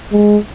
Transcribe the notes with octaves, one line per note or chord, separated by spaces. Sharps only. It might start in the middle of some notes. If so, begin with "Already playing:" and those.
G#3